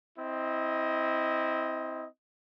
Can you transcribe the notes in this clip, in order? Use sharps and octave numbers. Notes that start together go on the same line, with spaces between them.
C4 E4 D#5